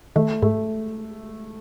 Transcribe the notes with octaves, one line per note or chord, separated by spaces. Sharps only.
D#3 A3
G#2 A3